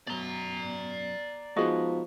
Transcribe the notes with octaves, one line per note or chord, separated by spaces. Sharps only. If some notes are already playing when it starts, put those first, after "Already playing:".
F#2 B2 D5 A#5
F3 G#3 B3 D#4 F#4 G#4 D#5